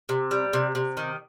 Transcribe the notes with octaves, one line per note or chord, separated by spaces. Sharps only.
C3
G3
C3
C3
D#3